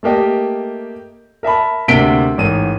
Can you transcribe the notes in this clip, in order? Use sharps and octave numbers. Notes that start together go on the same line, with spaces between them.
A3 A#3 G4 D#5
A#4 E5 A5 B5
D2 C3 A#3 B6 D7 G7
A1 G#2 A#4 D#7